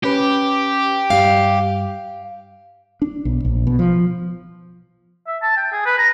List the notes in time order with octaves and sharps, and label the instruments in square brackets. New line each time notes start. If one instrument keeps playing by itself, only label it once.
[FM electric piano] C#4 B4 [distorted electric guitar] G4
[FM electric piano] G2 G3 [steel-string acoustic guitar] F5
[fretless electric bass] D4
B1
A#1
B2
F3
[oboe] E5
A5
G5
G#4
B4
A#5